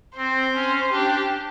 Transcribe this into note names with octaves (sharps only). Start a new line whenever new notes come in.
C4 C5
C#4
D4 G4